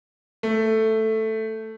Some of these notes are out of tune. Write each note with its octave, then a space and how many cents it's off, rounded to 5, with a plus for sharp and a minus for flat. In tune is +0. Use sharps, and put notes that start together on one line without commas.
A3 +5